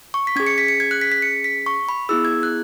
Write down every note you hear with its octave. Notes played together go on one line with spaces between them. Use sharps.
C#6
B6
C#4 G#4 G#6
C#7
B6
C#7
G#6
F#6
B6
B6
C#7
B6
C#6
B5
B3 E4 G#4 E6
G#6
F#6